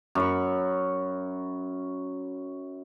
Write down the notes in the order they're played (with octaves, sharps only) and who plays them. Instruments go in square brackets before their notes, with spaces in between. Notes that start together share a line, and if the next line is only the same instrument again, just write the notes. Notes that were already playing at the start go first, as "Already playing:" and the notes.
[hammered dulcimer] F#2 B5 C#6